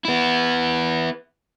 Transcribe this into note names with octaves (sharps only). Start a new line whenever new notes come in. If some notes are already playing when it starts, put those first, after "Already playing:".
B3 E4